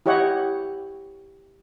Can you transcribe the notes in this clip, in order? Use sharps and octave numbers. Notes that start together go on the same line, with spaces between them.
E4 G4 C#5 D#5 F#5